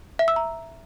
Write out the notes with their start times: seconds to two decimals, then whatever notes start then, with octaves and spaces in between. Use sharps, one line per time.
0.19 E5
0.28 E6
0.36 A#5